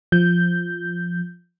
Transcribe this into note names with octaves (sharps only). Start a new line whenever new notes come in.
F3 G6